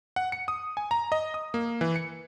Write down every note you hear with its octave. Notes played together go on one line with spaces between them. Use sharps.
F#5
C#7
D#6
G#5
A#5
D#5
D#6
A#3
E3
C#7